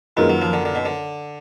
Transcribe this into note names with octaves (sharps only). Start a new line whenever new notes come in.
F#2 D#3 G#3 A#3 F4 B4
F#3
F3
D3
D3
B2
D3